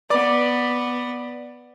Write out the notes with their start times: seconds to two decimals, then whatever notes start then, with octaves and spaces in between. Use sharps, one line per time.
0.10 B3 D5 D6